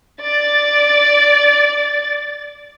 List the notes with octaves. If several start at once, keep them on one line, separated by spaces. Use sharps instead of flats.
D5 A6